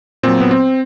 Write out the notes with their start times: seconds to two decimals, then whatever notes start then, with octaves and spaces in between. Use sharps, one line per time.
0.23 A#2 F#3 C4
0.40 B3
0.51 C4